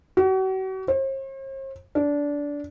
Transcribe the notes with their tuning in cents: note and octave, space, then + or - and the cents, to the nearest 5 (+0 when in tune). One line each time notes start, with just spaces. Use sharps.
F#4 +40
C5 +45
D4 -20